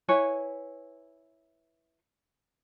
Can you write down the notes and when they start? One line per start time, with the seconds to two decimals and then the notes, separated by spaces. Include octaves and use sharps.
0.08 E4 B4 C#5 G#5